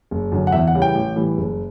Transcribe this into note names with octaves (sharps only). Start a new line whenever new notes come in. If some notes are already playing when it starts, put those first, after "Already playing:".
F#1
F#2 D3
F#5
E2 E5
F#5
C#3 E3 G3
G5
A1
A2 E3 G3
F#1